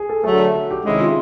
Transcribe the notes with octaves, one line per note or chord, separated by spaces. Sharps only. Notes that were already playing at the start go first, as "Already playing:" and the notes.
Already playing: G#4
A4
D3 F#3 A3 A4
F#4
G4
C3 D#3 G#3 C#4 E4 G4
F4